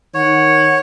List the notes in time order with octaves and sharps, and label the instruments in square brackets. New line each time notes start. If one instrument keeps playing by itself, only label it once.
[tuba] D#3 [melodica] C#5 [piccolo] F#5